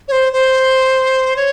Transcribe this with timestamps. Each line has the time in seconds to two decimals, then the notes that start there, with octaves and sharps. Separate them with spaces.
0.08 C#5
0.12 C5
0.33 C5
1.36 C#5